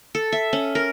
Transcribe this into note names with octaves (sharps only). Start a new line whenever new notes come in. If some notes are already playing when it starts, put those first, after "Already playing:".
A4
E5
C#4
A#4